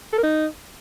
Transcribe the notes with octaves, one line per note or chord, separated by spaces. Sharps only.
A4
A#4
D#4